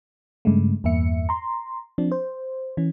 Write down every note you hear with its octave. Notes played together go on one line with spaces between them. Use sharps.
G2 C#3 G#3 A3
E2 G2 A#3 E5 C#7
A#5 C6
F3 C4 D4
C5
E3 C#4